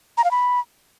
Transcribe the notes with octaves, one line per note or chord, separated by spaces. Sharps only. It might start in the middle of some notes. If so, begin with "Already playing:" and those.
A#5
F5
B5